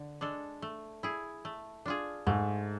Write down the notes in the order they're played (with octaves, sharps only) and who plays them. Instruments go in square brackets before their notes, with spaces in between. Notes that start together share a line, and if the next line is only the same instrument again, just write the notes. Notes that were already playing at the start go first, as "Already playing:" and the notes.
Already playing: [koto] D3
G#3 D4 A4
A3
E4 G#4
A3
D4 F4 G#4
[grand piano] G#2 [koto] A3